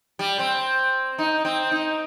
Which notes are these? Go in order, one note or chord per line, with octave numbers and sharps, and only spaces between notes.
G3
C4
D#4
C4
D#4